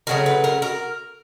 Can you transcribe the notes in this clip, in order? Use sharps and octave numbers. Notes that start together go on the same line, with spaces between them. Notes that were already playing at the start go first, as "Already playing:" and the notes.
C#3 F#3 A3 A#4
B4
A#4
A#4